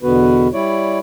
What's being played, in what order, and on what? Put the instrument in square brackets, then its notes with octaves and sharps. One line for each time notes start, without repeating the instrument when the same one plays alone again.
[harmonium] E2 B2 D3 B3 F#4 B4
G3 E4 C#5 D5